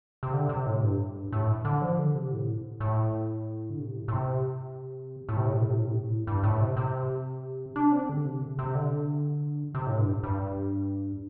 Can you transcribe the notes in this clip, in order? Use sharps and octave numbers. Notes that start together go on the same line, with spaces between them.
C3
D3
C3
A2
G2
A2
D3
F3
D3
C3
A2
A2
D3
C3
A2
A2
C3
A2
C3
A2
C3
A2
C3
A2
C3
A2
G2
A2
C3
C3
D4
C4
D3
C3
C3
D3
C3
A2
G2
G2